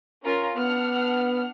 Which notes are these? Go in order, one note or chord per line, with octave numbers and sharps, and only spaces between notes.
C#4 F4 A#4
B3 D4 F#5 F6